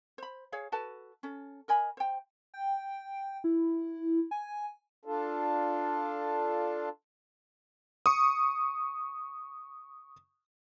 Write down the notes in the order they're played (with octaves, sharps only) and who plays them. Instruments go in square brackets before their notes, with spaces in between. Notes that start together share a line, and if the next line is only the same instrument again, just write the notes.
[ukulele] C5 B5
G#4 C#5 F5
F#4 A4 B4 A5
C#4 A4
A#4 D#5 G#5 B5
C5 G5
[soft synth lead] G5
E4
G#5
[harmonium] D4 F4 A4
[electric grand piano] C#6 D#6